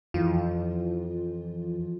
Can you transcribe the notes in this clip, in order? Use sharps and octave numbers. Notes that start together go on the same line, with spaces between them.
F2 E3 F3 F4